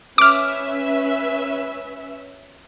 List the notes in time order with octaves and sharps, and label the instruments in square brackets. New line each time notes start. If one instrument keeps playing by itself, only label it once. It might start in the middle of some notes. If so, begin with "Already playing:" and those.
[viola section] C#4 B4 E5 [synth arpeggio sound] D6 F6